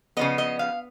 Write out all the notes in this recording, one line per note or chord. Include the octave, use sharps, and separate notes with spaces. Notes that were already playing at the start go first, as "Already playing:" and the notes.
C#3 F3 B3 D#5
D#5
F5